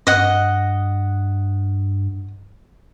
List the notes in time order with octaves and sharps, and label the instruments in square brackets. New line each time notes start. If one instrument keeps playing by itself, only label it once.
[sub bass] G2 [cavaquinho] D#5 F#5